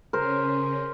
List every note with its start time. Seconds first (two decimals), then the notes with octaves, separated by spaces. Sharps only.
0.13 C#3 C#4 A#4 C5